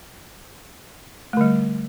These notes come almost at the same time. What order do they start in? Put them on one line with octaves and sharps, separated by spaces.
A3 D3 G3